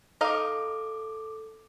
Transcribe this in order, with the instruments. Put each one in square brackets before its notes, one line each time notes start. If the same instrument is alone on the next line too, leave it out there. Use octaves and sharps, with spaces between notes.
[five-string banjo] D#4 D#5 F5 [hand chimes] A4 D6